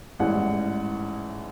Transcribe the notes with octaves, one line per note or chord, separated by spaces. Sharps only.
A1 G#2 E3 G3 F#5